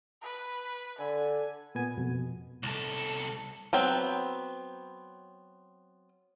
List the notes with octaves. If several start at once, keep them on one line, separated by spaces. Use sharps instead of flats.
B4
D3 G#5
A#2 B3 G#5
F2 B2
C2 A4
F#3 B3 C4